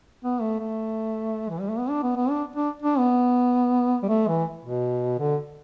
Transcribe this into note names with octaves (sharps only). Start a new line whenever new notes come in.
B3
A3
A3
E3
G3
A3
B3
D4
B3
B3
D4
D4
D4
B3
G3
A3
E3
B2
D3